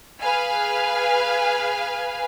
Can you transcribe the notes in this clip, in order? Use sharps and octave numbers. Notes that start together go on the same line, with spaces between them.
G#4 B4 F5 G#5